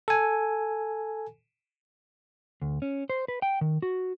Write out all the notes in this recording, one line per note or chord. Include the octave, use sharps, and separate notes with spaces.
A4 G#5
D2
C#4
C5
B4
G5
D#3
F#4